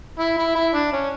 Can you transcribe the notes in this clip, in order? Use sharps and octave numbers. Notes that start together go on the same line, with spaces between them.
E4
E4
E4
D4
C#4